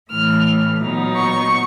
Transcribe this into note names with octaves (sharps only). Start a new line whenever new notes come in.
A2 E3 A3 F6
A#2 F#3 B3 D#4
C#6